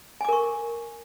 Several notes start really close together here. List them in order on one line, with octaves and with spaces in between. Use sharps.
G#5 D6 A#4 C#6